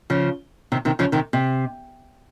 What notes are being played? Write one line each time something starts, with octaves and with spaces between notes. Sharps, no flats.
C#3 F3
C3 D#3
C3 D#3
C#3 F3
C3 D#3
C3